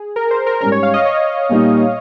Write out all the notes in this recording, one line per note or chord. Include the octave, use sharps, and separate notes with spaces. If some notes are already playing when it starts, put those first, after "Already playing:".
Already playing: G#4
A#4
C5
A#4
G#2 G3 C#4 A#4
C#5
F5
D#5
C#5
A#2 G3 A#3 D#4